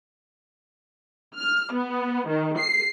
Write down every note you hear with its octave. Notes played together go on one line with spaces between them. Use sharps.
F6
B3
D#3
C7